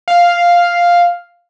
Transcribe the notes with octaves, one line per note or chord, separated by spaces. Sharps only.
F5